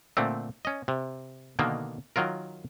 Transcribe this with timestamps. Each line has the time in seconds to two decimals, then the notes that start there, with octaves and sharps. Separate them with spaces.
0.17 A#2 D3 A3 C4
0.65 C#4 D#5
0.88 C3
1.59 B2 D3 D#3 A#3
2.16 D#3 F#3 F4 A#4